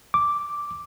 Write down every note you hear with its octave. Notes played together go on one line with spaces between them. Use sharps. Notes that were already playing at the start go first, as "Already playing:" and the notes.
D6